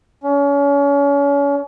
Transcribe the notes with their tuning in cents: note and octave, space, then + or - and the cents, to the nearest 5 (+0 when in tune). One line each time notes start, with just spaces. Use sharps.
C#4 +35